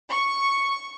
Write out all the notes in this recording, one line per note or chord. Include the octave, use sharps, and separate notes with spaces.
C#6